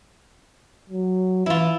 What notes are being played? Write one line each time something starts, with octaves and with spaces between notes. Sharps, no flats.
F#3
E3 E4 F4